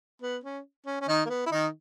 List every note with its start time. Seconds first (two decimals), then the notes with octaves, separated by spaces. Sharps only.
0.22 B3
0.44 C#4
0.86 C#4
1.01 C#4
1.08 D#3 D#4
1.26 A#3
1.30 B3
1.46 E4
1.52 D#3 D#4